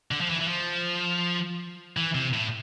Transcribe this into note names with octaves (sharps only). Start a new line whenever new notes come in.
D3
F3
E3
E3
F3
E3
C3
A2